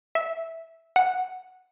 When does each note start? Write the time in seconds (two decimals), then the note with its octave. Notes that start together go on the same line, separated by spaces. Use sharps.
0.15 E5
0.96 F#5